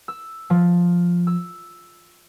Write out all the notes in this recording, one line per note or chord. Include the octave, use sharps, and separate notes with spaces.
E6
F3
E6